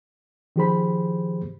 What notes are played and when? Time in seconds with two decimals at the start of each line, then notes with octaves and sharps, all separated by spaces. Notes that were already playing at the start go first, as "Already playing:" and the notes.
0.56 D#3 F3 G4 G#4 C5 B5